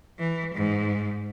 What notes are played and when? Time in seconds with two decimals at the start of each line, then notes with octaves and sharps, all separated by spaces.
0.19 E3
0.54 G#2